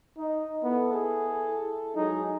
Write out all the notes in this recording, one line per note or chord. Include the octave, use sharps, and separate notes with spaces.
D#4 D#5
B3 E4 A4
G#4
F#3 G#3 D#4 G#4